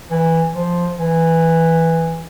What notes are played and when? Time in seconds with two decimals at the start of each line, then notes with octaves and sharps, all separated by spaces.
0.11 E3
0.55 F3
0.98 E3